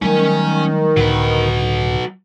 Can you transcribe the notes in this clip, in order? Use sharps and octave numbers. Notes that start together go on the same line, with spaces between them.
D#3 F#3 G3 A3 C#4 G#5
C#2 A2 D3 F#3 B4